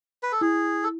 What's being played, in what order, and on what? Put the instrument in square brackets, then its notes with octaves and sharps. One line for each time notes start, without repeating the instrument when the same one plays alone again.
[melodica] B4
A4
[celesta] E4 [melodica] G#4
[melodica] A4